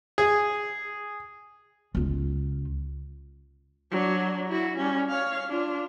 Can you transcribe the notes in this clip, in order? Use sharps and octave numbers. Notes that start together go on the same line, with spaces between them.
G#4
C#2 F4
F#3 D4
E4 F#4
G3 C#4
C#5 F5
D4 F4